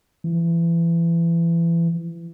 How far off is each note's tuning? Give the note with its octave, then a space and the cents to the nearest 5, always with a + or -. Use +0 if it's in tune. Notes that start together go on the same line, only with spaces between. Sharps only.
E3 +30